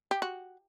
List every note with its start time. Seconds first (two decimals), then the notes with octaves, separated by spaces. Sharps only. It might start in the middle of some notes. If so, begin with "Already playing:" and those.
0.11 G4
0.22 F#4